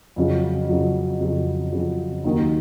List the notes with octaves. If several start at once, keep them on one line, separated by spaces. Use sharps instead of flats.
F2 C#3 F#3
F2 C#3 F#3
F2 C#3 F#3
F2 C#3 F#3
D#2 D#3 F#3 A#3 D#4